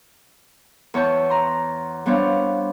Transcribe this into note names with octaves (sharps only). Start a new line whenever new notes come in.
E2 C#5 A5 C#6 G6
A#5 C6
G3 B3 D4 C5 C#5 F5